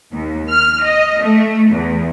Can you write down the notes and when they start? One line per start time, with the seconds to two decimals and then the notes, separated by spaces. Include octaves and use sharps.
0.13 D#2
0.49 F6
0.83 D#5
1.21 A3
1.70 E2